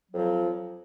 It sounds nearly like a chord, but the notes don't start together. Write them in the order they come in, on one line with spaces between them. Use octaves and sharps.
F#3 F2 F3